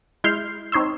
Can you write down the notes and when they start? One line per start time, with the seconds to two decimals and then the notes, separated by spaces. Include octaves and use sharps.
0.24 G#3 E4 C6 F6 G6 C7
0.72 C4 D#4 C#5 C6 E6